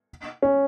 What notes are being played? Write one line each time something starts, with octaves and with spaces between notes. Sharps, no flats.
C#4